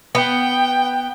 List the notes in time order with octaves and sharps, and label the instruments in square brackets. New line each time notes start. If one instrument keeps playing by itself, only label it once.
[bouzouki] B3 [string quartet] G5